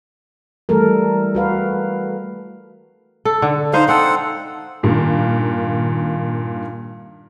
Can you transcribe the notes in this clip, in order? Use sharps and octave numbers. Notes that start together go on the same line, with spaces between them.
E3 G3 A3 A4 A#4
F#4 B4 F5
A4
D3
D#4 C5 D#5 F5
C4 A4 F#5
G2 A#2 D#3